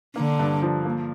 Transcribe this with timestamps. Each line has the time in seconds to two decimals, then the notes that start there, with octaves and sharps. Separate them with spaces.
0.16 D3 A#3
0.39 G2
0.62 F3
0.85 A#3